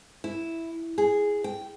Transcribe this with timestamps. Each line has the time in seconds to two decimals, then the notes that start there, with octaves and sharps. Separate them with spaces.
0.24 E4
0.98 G#4
1.44 G5